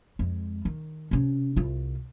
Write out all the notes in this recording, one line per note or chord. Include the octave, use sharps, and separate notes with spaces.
F2 G#3
D#3
C3 C#4
C2 F4